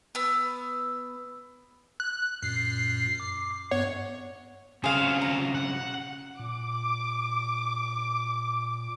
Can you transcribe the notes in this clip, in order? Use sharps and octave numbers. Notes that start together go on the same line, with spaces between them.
B3 E6
F#6
F#2 A#2 C7
D6
G2 B3 C#5 F#5
B1 C#3 F#4 G#4 C5 F5
A#5
F#5
A#2 D6